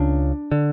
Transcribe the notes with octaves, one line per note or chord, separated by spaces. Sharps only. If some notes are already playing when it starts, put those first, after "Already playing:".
Already playing: C#2 C#3 D4
D3